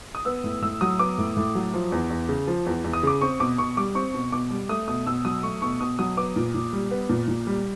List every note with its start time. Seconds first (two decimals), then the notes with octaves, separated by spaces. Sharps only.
0.15 D#6
0.25 B3 E6
0.44 A2
0.62 A2 E6
0.81 F#3 D#6
0.99 B3 D6
1.18 A2
1.37 A2
1.55 F#3
1.74 F3
1.92 E2
2.10 E2
2.29 C#3
2.48 F3
2.66 E2
2.84 E2
2.93 D#6
3.03 C#3 D6
3.21 C4 C#6
3.40 B2 D6
3.58 B2 C#6
3.77 G3 D6
3.95 C4 C#6
4.14 B2
4.32 B2 D6
4.51 G3
4.69 A3 D#6
4.88 B2 D#6
5.07 B2 E6
5.25 F#3 D#6
5.43 A3 C#6
5.62 B2 C#6
5.80 B2 D#6
5.99 F#3 D#6
6.17 B3 D6
6.36 A#2
6.54 A#2
6.73 G3
6.91 B3
7.09 A#2
7.28 A#2
7.47 G3